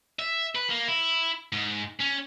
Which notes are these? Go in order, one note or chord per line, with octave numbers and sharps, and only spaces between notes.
E5
B4
A#3
E4
G#2
C#4